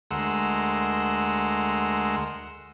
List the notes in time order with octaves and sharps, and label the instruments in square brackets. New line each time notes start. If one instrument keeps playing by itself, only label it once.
[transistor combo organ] D2 G#3 A#4 F#5 C6 E6